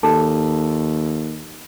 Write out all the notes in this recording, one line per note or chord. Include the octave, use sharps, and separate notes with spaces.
D#2 A4 A5